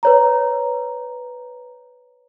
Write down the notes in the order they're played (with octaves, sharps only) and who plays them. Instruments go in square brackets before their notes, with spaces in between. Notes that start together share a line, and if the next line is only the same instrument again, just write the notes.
[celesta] B4 C#5 A#5